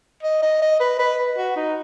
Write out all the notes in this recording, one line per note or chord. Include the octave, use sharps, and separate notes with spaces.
D#5
D#5
D#5
B4
B4
F#4
D#4